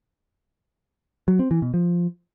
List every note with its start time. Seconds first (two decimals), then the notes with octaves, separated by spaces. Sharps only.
1.28 F#3
1.39 C4
1.51 E3
1.62 B2
1.74 F3